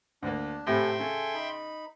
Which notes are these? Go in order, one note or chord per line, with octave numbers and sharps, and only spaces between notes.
D2 A#3 D4
A2 C3 E4 A4 E5 G5 G#5 C6
C#3 A4 G#5
D#4 B5